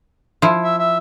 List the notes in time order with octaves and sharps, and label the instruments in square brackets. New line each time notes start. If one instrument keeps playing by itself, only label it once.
[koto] F3 E4
[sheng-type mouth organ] E5
E5